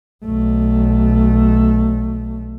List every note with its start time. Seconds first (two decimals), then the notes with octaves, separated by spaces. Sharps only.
0.25 B1 A3